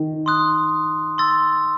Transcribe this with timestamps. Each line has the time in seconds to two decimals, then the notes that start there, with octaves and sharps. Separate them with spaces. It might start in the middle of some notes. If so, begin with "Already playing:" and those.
Already playing: D#3
0.26 C6 D#6 F#6
1.18 C6 E6 A6